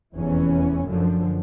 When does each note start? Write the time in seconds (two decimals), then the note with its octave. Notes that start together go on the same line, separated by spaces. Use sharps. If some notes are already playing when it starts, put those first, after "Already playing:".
0.14 F1 E2 E3 C#4
0.86 F#2 D3 F3